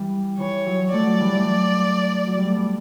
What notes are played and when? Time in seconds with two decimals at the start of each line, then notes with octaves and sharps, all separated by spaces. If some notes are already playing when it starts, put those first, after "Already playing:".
Already playing: E3 G3
0.39 E3 C#5
0.66 F#3
0.93 F#3 A3 D5
1.07 F#3
1.20 E3 G3
1.33 F#3 A3
2.27 F#3
2.37 G3
2.46 A3
2.55 G3 B3